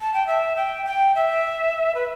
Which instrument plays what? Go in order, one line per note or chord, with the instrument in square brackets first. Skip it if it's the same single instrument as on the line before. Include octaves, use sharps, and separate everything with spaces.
[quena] A5
G5
E5
G5
G5
E5
B4